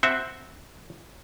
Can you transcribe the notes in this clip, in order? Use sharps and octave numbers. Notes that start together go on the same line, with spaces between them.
C4 F#4 E5